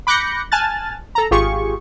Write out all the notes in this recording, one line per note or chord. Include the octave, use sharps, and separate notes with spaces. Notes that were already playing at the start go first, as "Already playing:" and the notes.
B5 D6 F#6 G6 A#6 C#7
G#5 A5 F6 F#6 A6
A4 A#5
G#1 F4 G4 G#4 C#6